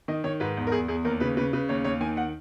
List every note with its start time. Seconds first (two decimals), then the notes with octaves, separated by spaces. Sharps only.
0.08 D#3 D#5
0.24 D#3 C#5
0.40 G#2 B4
0.57 E2
0.67 A#4
0.72 E2 G#4
0.88 E2 G#4
1.04 D#2 A#4
1.20 C#3 B4
1.37 C#3 B4
1.53 C#3 B4
1.69 D#2 C#5
1.84 D#2 C#5
2.01 D#3 G#5
2.17 F#5